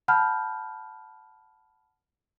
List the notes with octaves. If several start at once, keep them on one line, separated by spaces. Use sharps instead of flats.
F#5 A5 B5 F6 G6